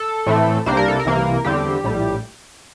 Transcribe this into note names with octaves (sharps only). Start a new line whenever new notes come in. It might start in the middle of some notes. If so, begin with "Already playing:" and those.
Already playing: A4
A2 E3 A3 C4
C2 C3 G3 A#3 D4 C5
A#4
A4
A#4
C2 C3 E3 A#3
E2 D3 G3 C4 G4
A#1 A2 G3